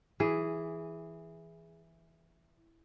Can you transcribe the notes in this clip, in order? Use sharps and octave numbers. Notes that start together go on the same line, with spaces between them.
E3 G#4